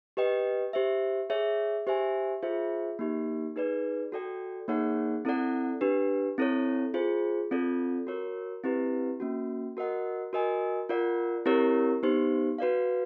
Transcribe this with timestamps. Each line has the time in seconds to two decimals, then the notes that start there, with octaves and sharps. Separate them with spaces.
0.17 G4 B4 D#5 G5
0.73 G4 C5 E5
1.30 G#4 C#5 E5
1.87 G4 C5 E5 G#5
2.43 F4 G#4 C5 E5
2.99 A#3 D#4 G4
3.56 D#4 G#4 B4 D5
4.12 F#4 A4 D5 G5
4.68 A#3 D#4 G#4 C#5 F#5
5.25 C4 E4 A4 D5 F#5
5.81 D4 G4 B4
6.38 C4 E4 A4 C#5
6.94 F4 G#4 C5
7.51 C4 F4 A4 D5
8.07 F#4 A#4 C#5
8.64 C4 E4 G4 B4
9.20 A#3 C#4 F#4
9.77 F#4 A#4 D#5 F#5
10.33 F#4 A#4 D#5 G#5
10.89 F4 A#4 D5 F#5
11.46 C4 E4 G4 A#4 C#5
12.03 B3 D#4 G4 C5
12.58 F#4 B4 D5 F5